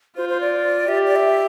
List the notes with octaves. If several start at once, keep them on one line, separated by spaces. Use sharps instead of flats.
F4 C5
C5
D5
G4 E5
D5
E5